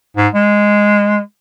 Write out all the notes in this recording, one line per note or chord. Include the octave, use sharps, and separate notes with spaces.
G#2
G#3